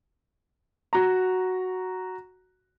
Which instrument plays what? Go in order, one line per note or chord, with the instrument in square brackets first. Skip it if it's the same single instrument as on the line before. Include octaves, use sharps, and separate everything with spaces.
[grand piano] F#4 A#5